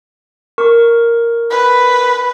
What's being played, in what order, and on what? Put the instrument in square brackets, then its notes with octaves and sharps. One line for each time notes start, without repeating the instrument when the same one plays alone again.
[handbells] A#4 C#6
[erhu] B4